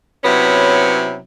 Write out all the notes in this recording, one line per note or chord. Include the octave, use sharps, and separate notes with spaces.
C3 F#3 B3 C#4 E4